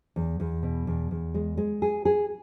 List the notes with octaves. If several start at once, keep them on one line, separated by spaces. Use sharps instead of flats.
E2
E2
B2
E2
E2
G#3
G#3
G#4
G#4